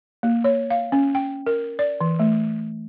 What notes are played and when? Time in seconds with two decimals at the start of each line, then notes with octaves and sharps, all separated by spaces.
0.23 A#3
0.44 C#5
0.71 F5
0.92 C#4
1.15 G5
1.47 A#4
1.79 D5
2.01 E3
2.19 A3